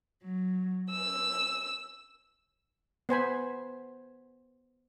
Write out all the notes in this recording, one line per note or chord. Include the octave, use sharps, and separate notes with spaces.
F#3
E6
B3 C5 G#5 B5